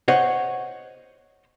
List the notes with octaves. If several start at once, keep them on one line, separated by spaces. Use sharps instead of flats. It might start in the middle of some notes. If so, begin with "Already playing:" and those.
C5 C#5 D#5 F#5